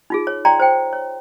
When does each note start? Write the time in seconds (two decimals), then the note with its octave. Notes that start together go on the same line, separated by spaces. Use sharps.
0.10 D#4 F4 G#4
0.27 C#5
0.45 D5 G5 A#5 C6
0.60 C5 G5
0.93 C#5